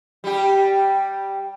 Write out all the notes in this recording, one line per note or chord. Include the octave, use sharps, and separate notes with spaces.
G3 G4